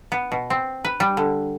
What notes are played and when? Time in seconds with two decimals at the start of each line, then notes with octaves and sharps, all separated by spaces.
0.12 B3
0.32 B2
0.50 C4
0.85 B4
1.00 G3
1.17 D3